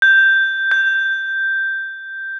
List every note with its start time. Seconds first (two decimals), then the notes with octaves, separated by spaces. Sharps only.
0.02 G6
0.71 G6